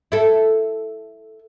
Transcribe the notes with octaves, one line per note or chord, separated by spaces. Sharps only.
E4 A4